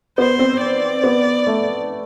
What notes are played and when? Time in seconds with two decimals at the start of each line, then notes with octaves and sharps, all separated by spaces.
0.18 B3 C5
0.39 C4
0.61 D5
1.04 B3
1.47 A3